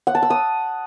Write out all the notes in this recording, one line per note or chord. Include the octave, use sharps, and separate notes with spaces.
F#5
A5
E6
D#6